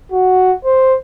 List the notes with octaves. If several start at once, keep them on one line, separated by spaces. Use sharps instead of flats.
F#4
C5